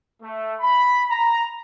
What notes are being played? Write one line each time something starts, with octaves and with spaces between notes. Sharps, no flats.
A3
B5
A#5